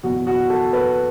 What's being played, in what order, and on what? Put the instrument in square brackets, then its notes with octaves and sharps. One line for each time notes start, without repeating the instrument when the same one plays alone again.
[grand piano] F#1 E2 B2 F#4
F#4
A4
B4